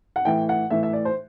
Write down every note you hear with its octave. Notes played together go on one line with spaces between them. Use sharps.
F#5
A2 E3 G5
F#5
A2 E3 E5
E5
D5
C5